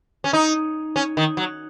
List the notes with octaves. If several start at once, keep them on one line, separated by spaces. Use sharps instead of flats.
C#4
D#4
C#4
D#3
F#3